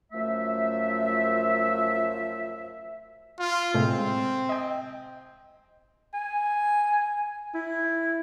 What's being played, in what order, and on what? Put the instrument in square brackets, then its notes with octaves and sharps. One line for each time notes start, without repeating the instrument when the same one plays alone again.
[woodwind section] F#2 F3 A3 E5
[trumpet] F4
[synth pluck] A2 C3 G#3 [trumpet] C4
[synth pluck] D#5 G5
[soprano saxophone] G#5
E4